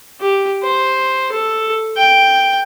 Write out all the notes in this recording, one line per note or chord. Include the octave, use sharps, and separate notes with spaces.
G4
C5
A4
G5